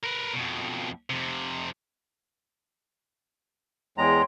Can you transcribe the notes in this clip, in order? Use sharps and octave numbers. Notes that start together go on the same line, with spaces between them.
A#4 B4
F2 B2
F2 C3
E2 G#3 C#5 G5 A#5 C6